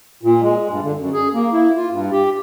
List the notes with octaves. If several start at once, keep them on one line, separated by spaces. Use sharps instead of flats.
A#2
G#3
G2
D3
F#2
G#4
A#3
E4
F4
G2
G4